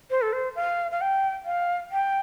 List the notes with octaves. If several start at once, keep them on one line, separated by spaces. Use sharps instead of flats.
C5
A4
C5
F5
F5
G5
F5
G5